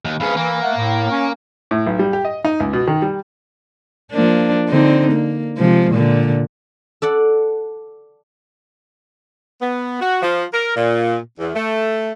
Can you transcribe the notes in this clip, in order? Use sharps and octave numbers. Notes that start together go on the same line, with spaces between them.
D#2
D2 C#4 G#4 B4 F5
E3 A#3
A3 F#5
A2
C#4
A2
B1
G3
G4
D#5
D#4
C#2
B2
D#3
G3
F3 A#3 D4
D3 C4 D#4
A#3
C3 F3 G#3
A#2 D3
A4 D5 F#5
B3
F#4
F3
A#4
A#2
E2
A3